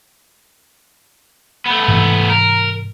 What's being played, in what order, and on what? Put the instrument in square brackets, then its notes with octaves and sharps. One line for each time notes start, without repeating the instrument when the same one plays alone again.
[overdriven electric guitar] A3 B3
[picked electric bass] G#2 C3 E3
[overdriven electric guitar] A#4